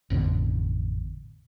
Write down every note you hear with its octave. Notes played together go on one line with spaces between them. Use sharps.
A1 F2 B2 D3